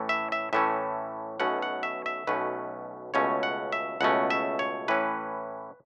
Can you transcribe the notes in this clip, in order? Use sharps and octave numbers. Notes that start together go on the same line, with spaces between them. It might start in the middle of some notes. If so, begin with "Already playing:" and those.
Already playing: A2 E3 A3 C#4
E5
E5
A2 E3 A3 C#4 E5
B1 B2 A3 C#4 F#5
F#5
E5
E5
B1 B2 A3 C#4 B4
C#2 B2 A3 C#4 C#5
F#5
E5
C#2 B2 A3 C#4 F#5
E5
C#5
A2 E3 C#4 B4